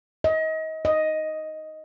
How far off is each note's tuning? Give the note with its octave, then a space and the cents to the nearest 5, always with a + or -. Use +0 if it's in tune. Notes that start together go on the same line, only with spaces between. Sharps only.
D#5 +30
D#5 +5